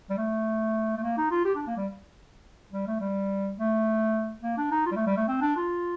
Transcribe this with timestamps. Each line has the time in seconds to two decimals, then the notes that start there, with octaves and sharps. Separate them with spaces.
0.10 G3
0.18 A3
0.97 A3
1.03 A#3
1.17 D#4
1.31 F4
1.45 G4
1.55 D4
1.67 A#3
1.77 G3
2.72 G3
2.87 A3
3.00 G3
3.58 A3
4.42 A#3
4.57 D4
4.71 D#4
4.86 F4
4.92 G3
4.96 A3
5.06 G3
5.17 A3
5.28 C4
5.41 D4
5.56 F4